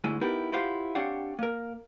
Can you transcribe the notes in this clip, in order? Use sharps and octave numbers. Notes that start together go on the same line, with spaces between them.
D2 G#2 G#3 E4 G#5
B3 D#4 E4 G4 A#4 B4
E4 F4 G4 C5 F5 F#5
C4 D4 G4 C#5 F5 F#5
A#3 A#4